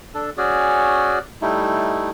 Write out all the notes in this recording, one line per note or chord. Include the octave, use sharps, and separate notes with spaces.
D4 A4
C#4 F#4 G#4 D5
G3 A3 D#4 E4